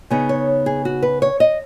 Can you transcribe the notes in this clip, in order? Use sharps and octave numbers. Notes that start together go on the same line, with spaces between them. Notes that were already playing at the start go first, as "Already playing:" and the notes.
C#3 B3 D#4 G#4
C#5
G#4
F#4
B4
C#5
D#5